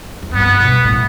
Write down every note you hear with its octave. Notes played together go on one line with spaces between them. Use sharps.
F2
G2 B3
B2
A2